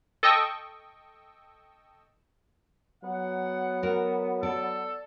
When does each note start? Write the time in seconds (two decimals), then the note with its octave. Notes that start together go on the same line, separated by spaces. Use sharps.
0.23 A4 D#5 G5 C#6 E6
3.04 F#3 B3 F#5
3.83 F#4 A#4
4.43 A4 D5